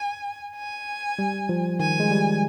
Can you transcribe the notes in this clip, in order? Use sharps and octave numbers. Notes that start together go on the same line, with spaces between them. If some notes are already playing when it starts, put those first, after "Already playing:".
Already playing: G#5
G#5
G3
F3
D#3 G#5
G#3
G3